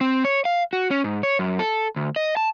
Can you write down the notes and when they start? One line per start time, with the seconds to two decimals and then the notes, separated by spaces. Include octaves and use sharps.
0.01 C4
0.25 C#5
0.45 F5
0.73 F#4
0.91 C#4
1.04 G#2
1.23 C#5
1.39 F#2
1.59 A4
1.96 D2
2.16 D#5
2.37 A5